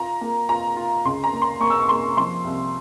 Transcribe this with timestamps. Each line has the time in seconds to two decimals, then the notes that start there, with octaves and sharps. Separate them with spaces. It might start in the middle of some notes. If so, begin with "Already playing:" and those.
Already playing: F4 A#5
0.21 A#3
0.49 F4 A#5
0.77 F4
1.05 C#2 C6
1.24 A#5
1.33 A#3
1.42 C6
1.60 A#3 C#6
1.70 E6
1.79 C#6
1.89 A#3 C6
2.17 F3 C6
2.44 C2